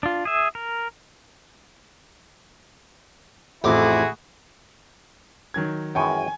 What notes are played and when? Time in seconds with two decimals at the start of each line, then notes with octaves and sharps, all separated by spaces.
0.03 D4 F4
0.25 G#4 E5
0.55 A#4
3.64 A1 F2 E4 F#4 G#4 D6
5.54 D#3 F#3 G#6
5.95 F#2 E3 G#3 G5 G#5 C#6